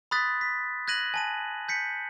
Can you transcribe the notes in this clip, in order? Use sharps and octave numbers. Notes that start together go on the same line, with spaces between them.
B5 C6 D#6 F#6 A6 B6
B6
F#6 G#6 A#6 D#7 F#7
G#5 A5 D#7
G6 B6 C#7